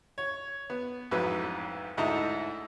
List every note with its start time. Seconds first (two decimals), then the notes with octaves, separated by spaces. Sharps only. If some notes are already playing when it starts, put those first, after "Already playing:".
0.18 C#5
0.70 B3
1.11 A1 F2 G#2 F#3 B4
1.97 D2 G#2 E4 A4 D#5 A#5